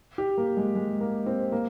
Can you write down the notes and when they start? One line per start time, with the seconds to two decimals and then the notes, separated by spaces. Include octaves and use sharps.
0.18 G4
0.38 A#3
0.57 G#3
0.75 G#3
1.01 A#3
1.26 C4
1.52 A#3